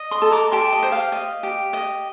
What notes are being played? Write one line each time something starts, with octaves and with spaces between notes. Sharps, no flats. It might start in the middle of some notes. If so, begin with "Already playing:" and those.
Already playing: D#5
C6 D#6
A4
A#5 D6
G4 A5 C6
D#5
C5
F5
D#5
G4
D#5